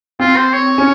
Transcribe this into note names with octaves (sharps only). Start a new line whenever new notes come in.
C4 F4
C5
C#5
C#4